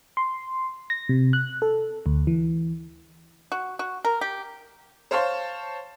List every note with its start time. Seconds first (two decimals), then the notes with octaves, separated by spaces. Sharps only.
0.17 C6
0.90 A#6
1.09 C3
1.33 F#6
1.62 A4
2.06 D2
2.27 E3
3.52 F#4
3.79 F#4
4.05 A#4
4.21 G4
5.11 C5 C#5 F5 A5 C6